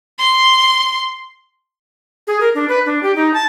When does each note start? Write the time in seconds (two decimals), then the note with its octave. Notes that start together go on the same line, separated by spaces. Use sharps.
0.19 C6
2.27 G#4
2.40 A#4
2.55 D4
2.69 B4
2.86 D4
3.03 G4
3.16 D#4
3.34 A5